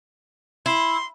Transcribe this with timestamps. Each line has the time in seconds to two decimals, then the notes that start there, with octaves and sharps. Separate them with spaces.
0.66 E4 C6